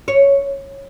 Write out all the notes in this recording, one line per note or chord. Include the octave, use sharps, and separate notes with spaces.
C#5